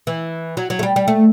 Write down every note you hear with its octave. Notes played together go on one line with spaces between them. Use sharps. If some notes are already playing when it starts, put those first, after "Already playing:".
E3
F#3
F#3
A3
G3
G3
A3